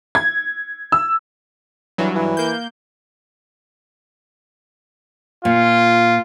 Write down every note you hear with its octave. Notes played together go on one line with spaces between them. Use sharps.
G#6
E6
G2 E3 F#3
E3
A#3 G6
A#2 F4